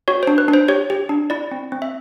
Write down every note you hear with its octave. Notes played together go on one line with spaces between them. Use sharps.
F#4 C#5
D4 C5
B4
D4
C5
G4 C#5
G4
D4
E4 D5
C4
C4
E5